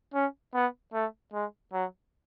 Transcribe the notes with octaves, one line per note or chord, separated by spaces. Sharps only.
C#4
B3
A3
G#3
F#3